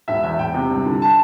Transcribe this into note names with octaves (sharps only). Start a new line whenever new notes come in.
E1 E5
E2 E5
E1 G5
C3
G2
D3
A5